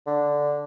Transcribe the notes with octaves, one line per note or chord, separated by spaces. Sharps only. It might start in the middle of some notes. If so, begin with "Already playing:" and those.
D3